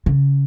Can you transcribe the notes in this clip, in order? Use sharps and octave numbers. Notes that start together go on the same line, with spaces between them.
C#3